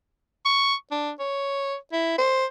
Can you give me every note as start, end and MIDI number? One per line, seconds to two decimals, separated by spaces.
0.45 0.75 85
0.92 1.12 62
1.19 1.76 73
1.93 2.18 64
2.18 2.46 72